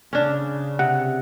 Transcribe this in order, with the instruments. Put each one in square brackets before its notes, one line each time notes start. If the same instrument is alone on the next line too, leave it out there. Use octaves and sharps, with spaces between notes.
[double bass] C#3 [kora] C#4 D4
[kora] C3 [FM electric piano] F#5